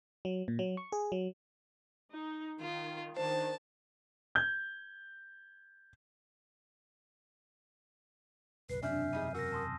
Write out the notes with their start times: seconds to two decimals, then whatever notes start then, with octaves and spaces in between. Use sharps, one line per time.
0.25 F#3
0.48 A#2
0.59 F#3
0.77 C#6
0.92 G#4
1.12 F#3
2.10 D#4
2.62 D#3 F4
3.17 D#3 D4 C5 A5
4.35 G6 G#6
8.70 F#1 B1 B4 C7
8.83 E1 F#2 C3 D4 E5 G#5 F6 G6
9.13 G3 D#4 G#4 D#7
9.35 F#4 A#4 E6 A#6
9.52 A5 C6 D#6